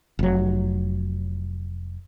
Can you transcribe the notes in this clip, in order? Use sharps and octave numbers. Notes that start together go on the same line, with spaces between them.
F1 F#3